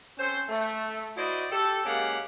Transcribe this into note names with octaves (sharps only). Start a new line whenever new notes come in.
C4 C#4 A4 C5
A3
E4 F#4 C5 D5 D#5
G4 A4
G#3 A#3 C#4 G4 F5 F#5